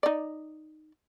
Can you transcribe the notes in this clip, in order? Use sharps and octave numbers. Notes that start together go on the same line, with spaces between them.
D#4 D5